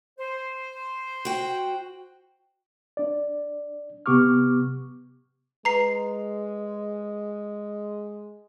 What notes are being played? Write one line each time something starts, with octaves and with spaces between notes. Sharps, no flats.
C5
F#4 G5
D4 D5
C3 B3 G4 C#6 D6 F6
G#3 B4 A#5 C7